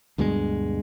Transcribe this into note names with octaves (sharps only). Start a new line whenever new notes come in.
D2 G2 B2 G#3